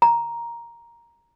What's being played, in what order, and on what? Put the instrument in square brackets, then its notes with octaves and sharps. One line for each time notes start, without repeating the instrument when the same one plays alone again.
[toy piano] A#5